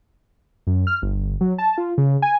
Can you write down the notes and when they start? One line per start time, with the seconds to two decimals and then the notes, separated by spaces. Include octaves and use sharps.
0.67 F#2
0.87 F6
1.02 G1
1.41 F#3
1.58 A5
1.78 F4
1.98 C#3
2.22 G#5